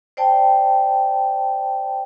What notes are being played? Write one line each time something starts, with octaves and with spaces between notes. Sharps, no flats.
C5 D5 G5 A5